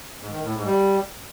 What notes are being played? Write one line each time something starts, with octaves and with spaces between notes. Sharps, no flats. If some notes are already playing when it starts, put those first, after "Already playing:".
G#2
D#3
A2
G#2
G3